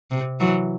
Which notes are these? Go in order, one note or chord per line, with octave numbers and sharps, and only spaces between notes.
C3
E3 F#3